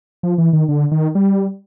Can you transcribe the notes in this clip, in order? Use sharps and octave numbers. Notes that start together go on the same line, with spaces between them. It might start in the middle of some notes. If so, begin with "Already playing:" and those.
F3
E3
D#3
D3
D#3
G3